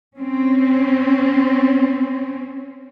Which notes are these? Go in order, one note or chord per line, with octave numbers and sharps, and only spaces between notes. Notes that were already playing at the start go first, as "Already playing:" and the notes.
C4 C#4